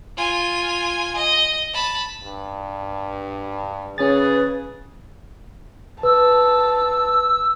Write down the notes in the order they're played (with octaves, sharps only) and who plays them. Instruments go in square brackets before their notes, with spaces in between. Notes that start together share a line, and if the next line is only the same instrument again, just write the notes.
[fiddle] F4 G#5
D#5
A5 B5
[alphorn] G2
[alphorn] C#3 [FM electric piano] C#4 A6 [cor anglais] G#4 [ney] B4
[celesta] B4 [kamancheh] A5 [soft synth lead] E6